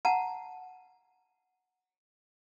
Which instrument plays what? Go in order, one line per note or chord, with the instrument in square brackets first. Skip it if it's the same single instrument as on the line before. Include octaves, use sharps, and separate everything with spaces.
[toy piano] F#5 A5 A#5